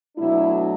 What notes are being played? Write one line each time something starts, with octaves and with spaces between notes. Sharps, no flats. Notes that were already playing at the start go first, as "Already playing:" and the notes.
B2 F#3 A3 D4 E4